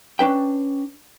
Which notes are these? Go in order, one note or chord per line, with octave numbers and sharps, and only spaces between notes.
C#4 D4 B4 G5